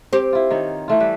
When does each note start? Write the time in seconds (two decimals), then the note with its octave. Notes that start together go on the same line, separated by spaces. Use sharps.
0.13 C4 G4
0.33 E4 F4
0.51 D#3 D#4 C#5
0.88 E3 A3 F4
1.00 G3 B4 E5